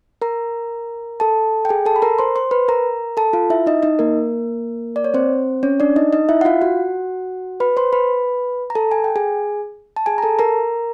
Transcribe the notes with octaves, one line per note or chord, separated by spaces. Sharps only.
A#4 A#5
A4 A5
G5
G#4 G#5
A4 A5
B5
A#4 A#5
C5 C6
C5 C6
B4 B5
A#4 A#5
A4 A5
F4 F5
E4 E5
D#4 D#5
D#4 D#5
A#3 A#4
D5
C#5
C4 C5
C#4 C#5
D4 D5
D#4 D#5
D#4 D#5
E4 E5
F#5
F4 F5
F#4 F#5
B4 B5
C5 C6
B4 B5
A#5
A4 A5
G#5
G5
G#4 G#5
A5
G#4 G#5
A#5
A4 A5
A#4 A#5